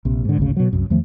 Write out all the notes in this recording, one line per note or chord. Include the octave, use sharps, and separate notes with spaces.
A#1 C3
G#2 D3
G#1 D2 C#3
B2 F#3
C2 F#2
E2 D#3 F3 A3